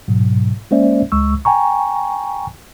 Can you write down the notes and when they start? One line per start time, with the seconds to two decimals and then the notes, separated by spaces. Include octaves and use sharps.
0.08 G#2 B2 F#3
0.71 G#3 A#3 C#4 C5 D5 E5
1.12 C#2 G#3 C#6 E6
1.45 G5 G#5 A#5 C#6